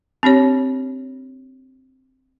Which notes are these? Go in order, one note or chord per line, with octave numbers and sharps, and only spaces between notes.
C4 D4 G4 C#5